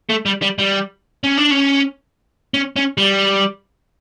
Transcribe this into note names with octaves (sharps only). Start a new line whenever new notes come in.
A3
G3
G3
G3
C#4
D4
C#4
C#4
C#4
G3